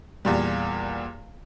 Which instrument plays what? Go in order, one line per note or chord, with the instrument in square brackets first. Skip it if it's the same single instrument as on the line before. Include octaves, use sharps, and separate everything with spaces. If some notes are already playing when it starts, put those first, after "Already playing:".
[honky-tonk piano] E2 A#2 G3